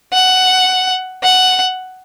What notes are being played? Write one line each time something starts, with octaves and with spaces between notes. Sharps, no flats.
F#5
F#5